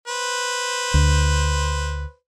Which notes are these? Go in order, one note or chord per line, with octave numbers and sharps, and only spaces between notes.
B4 C5
D2